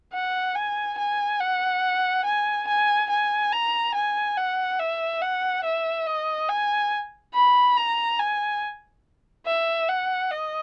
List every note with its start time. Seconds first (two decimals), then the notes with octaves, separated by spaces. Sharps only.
0.13 F#5
0.55 G#5
0.98 G#5
1.40 F#5
2.25 G#5
2.68 G#5
3.10 G#5
3.53 A#5
3.95 G#5
4.37 F#5
4.79 E5
5.22 F#5
5.64 E5
6.07 D#5
6.49 G#5
7.34 B5
7.77 A#5
8.19 G#5
9.47 E5
9.89 F#5
10.31 D#5